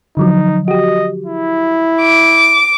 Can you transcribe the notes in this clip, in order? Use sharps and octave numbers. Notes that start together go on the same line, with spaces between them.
D3 F3 F#3 D#4
F#4 G4 D#5
E4
D6